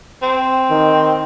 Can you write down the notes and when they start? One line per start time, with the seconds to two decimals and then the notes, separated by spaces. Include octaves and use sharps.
0.22 C4
0.70 D#3